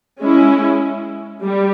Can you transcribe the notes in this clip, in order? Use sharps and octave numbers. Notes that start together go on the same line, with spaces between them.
G#3 C#4 E4
G3